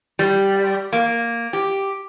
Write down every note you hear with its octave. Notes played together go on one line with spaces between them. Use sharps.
G3
A#3
G4